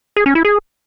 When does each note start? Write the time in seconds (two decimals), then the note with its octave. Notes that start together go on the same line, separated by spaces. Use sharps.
0.16 G#4
0.26 C#4
0.35 E4
0.45 G#4